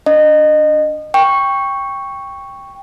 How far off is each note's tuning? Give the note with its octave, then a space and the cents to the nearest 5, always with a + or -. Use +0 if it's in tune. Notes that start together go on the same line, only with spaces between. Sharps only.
D4 -25 D#5 -25
G5 +10 C#6 +0